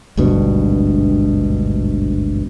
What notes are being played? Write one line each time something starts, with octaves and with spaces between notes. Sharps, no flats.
G#1 D2 G2 B2